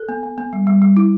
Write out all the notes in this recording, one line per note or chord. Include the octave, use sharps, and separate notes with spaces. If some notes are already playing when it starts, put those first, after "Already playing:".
Already playing: A4
B3
B3
B3
G3
G3
G3
E4